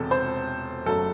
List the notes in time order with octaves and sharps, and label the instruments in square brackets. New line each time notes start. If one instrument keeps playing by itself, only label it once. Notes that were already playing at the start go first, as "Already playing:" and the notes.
Already playing: [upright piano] E1 E2 C3 A4
C5
F#1 F#2 F#3 A3 A4